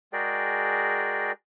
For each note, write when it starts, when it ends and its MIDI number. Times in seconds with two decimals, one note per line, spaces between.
0.13 1.32 56
0.13 1.32 66
0.13 1.32 68
0.13 1.32 70
0.13 1.32 74
0.13 1.32 79